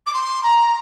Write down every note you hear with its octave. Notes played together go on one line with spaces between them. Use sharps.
D6
C6
A#5